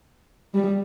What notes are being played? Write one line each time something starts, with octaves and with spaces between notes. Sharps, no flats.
G3